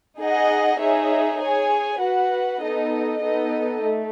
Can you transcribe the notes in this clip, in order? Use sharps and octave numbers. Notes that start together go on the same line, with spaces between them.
D#4 G#4 D#5 F#5
D#4 G#4 C#5 E5
G#4 C#5 G#5
F#4 B4 F#5
B3 D#4 A4 D#5
B3 D#4 A4 D#5
A3